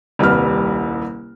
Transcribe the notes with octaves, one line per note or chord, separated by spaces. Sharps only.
D#1 C2 G3 B4 F6